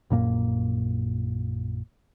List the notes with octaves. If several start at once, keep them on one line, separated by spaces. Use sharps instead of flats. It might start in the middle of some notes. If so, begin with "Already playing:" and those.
A#1 F#2 A#2 A#3